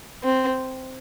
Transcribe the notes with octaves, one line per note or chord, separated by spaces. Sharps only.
C4